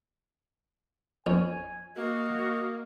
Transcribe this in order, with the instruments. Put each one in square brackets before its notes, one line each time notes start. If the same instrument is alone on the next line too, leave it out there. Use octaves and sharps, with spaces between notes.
[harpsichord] F2 C#4 [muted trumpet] G#5
[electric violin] A#3 [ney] F#4 [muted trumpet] D#5